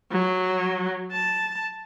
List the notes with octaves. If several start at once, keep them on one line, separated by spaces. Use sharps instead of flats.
F#3
A5